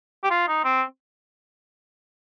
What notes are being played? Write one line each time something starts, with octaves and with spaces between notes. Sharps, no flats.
G4
F4
D#4
C4